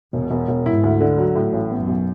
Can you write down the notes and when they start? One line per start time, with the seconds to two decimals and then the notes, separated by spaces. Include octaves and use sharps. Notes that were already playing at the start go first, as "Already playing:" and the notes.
0.13 E1 B2
0.30 E1
0.48 E1
0.66 G#2 E4
0.84 D2
1.00 D3
1.18 F#3
1.36 A2
1.53 A1
1.70 F#2 B3
1.87 B1